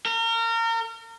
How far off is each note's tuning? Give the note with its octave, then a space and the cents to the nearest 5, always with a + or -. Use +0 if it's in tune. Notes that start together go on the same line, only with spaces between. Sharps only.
A#4 -30